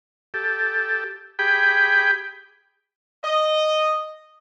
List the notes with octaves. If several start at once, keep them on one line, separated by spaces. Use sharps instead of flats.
G4 A4
G4 G#4 G5 B5
D#5